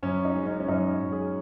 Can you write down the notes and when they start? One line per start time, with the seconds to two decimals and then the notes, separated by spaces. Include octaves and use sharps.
0.03 F#2 C#4
0.25 D#4
0.36 G#3
0.46 C#4
0.60 C#4
0.68 F#2 D#4
0.91 C#5
1.01 F#2
1.12 G#4